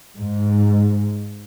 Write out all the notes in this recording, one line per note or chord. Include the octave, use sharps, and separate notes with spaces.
G#2